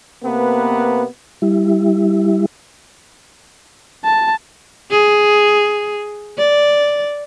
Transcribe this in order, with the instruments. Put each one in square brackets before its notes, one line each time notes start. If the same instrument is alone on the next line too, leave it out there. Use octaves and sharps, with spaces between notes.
[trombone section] C3 A#3 B3 B4
[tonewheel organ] G3 E4
[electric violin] A5
[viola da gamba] G#4
D5